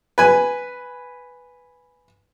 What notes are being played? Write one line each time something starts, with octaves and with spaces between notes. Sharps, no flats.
B4 G#5